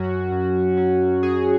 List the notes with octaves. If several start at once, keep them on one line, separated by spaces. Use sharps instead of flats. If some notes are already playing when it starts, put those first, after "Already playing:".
Already playing: F#2 F#3 C#4 F#4
F#2
F#3 C#4
F#2 G#4